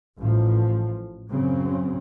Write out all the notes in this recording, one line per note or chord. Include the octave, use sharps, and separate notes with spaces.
A1 F3
F#2 C#3 F#3 C4